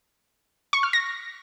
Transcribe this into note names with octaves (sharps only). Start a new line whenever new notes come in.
C#6
F6
A#6